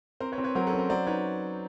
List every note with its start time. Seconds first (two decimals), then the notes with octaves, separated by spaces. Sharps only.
0.20 C4 A#4 C5
0.32 B4 C#5
0.38 C4
0.44 B4 C#5
0.55 F#3 A#4 C5
0.67 A4 B4
0.73 C#4
0.78 A#4 C5
0.90 F#3 C5 D5
1.07 D#4 B4 C#5